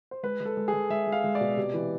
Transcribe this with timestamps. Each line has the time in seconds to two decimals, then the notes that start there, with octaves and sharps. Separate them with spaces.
0.11 C5
0.23 G#3 B4
0.40 G#3
0.45 A4
0.57 G#3
0.68 G#4
0.74 G#3
0.90 G#3 E5
1.07 G#3
1.12 F5
1.24 G#3
1.35 D5
1.41 B2
1.57 C3
1.74 E3